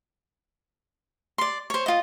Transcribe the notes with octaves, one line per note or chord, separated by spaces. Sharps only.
D5 C6
C5 C#5
F4 D#5